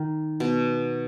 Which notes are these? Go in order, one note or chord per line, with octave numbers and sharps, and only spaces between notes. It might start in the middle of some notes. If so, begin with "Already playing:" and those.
Already playing: D#3
B2